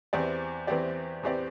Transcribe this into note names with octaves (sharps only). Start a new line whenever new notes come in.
E2 E3 C4 G4 D5
E2 E3 C4 G4 D5
E2 E3 C4 G4 D5